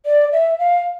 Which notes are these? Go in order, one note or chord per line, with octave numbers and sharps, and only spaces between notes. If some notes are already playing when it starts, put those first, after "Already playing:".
D5
E5
F5